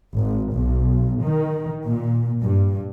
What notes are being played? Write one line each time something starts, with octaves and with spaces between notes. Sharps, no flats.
G#1
B1
D#3
A#2
G2